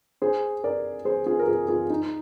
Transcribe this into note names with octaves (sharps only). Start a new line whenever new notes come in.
G#4 C5
A#4 D5
G#4 C5
F4 G#4
A#4
F4 G#4
F4 G#4
D#4